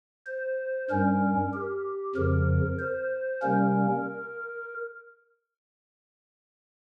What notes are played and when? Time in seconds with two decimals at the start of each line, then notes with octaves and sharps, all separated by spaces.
0.27 C5
0.90 G2 G3 C#4 A#4
1.53 G4
2.16 F2 C#3 F3 A#4
2.79 C5
3.42 C3 G3 A#3 C#4 A#4